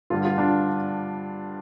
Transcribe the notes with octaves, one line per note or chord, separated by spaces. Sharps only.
G2 D3 G3 F4
F4
D4